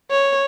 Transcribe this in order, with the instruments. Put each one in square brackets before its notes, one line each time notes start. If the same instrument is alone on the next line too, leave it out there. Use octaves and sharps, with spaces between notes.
[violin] C#5